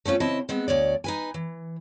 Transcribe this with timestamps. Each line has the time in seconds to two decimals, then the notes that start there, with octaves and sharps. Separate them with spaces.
0.05 A3 C4 C#4 F4
0.20 C#3 C4 E4 D#5 A5
0.49 G#3 B3 C4
0.68 D2 C#5 D5
1.04 D#4 B4 G#5
1.34 E3